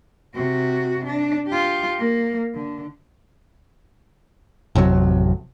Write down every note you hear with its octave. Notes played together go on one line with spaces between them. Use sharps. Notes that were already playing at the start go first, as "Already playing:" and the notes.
C3 F#4
D4
F4 G4
A#3
D3
A1 F2 C3 F#3